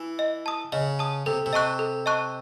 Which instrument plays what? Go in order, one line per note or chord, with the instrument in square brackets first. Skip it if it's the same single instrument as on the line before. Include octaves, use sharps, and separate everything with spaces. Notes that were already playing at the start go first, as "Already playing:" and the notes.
Already playing: [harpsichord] E3
[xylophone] D#5
A5 D#6
[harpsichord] C#3 [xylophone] D#5
[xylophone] A5 D#6
[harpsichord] C3 [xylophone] A4
[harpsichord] C3
[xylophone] D#5 A5 C#6 F#6
A4
D#5 A5 C#6 F#6